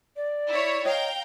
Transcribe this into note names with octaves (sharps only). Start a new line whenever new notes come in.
D5
E4 C#5
C#5 D#5 F5 G5 A#5